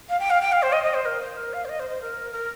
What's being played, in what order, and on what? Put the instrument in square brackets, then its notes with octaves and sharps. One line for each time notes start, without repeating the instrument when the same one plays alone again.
[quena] F5
G5
F5
G5
F5
C5
D#5
D#5
C5
A#4
C5
A#4
F5
C5
D#5
C5
C5
A#4
A#4